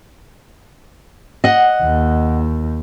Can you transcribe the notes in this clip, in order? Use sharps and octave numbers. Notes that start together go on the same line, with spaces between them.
D#5 F#5
D#2